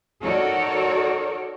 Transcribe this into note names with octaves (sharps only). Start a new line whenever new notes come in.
D#4 F#4 A4 A#4 C#5 D5